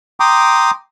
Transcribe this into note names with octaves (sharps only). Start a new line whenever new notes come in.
G5 A#5 C6 D6 D#6